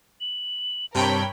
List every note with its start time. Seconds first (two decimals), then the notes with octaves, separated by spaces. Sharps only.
0.21 F#7
0.95 G2 C3 A#4 C#5 G5 A5 B5